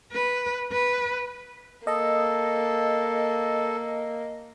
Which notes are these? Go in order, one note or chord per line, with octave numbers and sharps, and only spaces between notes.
B4
B4
A#3 A4 D#5